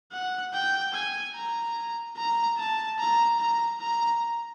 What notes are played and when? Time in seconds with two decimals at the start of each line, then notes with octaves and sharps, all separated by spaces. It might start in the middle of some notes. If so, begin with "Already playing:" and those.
0.12 F#5
0.53 G5
0.94 G#5
1.35 A#5
2.17 A#5
2.58 A5
2.99 A#5
3.40 A#5
3.80 A#5